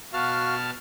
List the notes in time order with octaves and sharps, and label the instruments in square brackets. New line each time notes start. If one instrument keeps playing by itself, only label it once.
[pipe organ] B2 A5 F6 [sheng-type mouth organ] F#4 F5